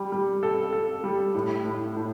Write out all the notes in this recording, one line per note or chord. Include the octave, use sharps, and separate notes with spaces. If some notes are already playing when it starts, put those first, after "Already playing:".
Already playing: G3
G3
A4
A4
G3
A2
A2
A2